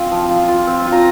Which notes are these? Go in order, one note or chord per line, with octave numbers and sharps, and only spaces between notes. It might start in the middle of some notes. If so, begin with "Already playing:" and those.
Already playing: C4 F4 F5
F3
F4
F4
C4
F4
A#5